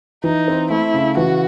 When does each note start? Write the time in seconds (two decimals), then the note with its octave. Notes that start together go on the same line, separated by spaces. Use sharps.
0.24 E3 D#4
0.48 C4
0.70 A3 E4
0.94 C#3
1.17 E3 F#4